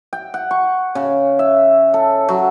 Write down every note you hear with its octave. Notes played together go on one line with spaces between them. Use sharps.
G5
F#5
C#6
C#3
E5
A4
F#3